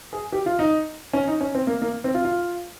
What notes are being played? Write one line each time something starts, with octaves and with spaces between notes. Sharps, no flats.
G#4
G4
F4
D#4
C#4
D#4
C#4
C4
A#3
A#3
C4
F4
F4